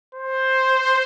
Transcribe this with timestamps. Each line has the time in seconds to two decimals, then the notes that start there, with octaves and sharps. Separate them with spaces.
0.15 C5